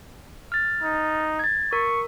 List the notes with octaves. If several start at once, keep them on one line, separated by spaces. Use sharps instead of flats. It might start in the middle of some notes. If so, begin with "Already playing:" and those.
F6 A6
D#4
G#6 A6
A#4 C#6